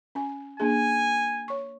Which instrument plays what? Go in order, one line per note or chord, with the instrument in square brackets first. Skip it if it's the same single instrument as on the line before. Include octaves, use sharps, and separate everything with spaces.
[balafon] C#4 G#5
[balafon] A#3 D4 G#4 [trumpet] G#5
[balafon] C#5 C#6